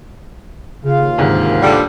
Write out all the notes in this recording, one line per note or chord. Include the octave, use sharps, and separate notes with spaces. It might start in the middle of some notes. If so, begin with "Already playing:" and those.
D#2 C#3 F4 F5
D2 G#2 C3 D#3
D3 G3